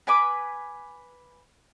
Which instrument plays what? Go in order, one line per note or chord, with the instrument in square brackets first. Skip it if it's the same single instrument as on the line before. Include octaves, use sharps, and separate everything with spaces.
[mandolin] B4 G#5 B5 D6